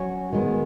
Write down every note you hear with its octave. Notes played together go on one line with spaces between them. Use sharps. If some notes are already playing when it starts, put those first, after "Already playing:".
Already playing: F#3 C#4 F#4 C#5
D#3 G#3 B3